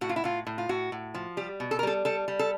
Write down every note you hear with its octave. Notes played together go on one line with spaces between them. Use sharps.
A2 F#4
F4
E4
A2 F4
A2
F4
A2 F#4
A2
F3
G3 G4
B2
A4
A#4
G3 A4
G3 A4
G3
A4